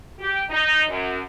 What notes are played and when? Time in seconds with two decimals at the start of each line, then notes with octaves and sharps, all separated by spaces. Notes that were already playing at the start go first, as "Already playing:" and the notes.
0.19 G4
0.50 D#4
0.88 F#2